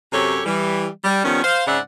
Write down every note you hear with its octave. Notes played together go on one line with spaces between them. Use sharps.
F#2 C3 G4 A4 C#5
E3 G3
G3
D#3 F3 G3 B3 C#4
C5 F5
G#2 C#3 C4 D5 E5 F#5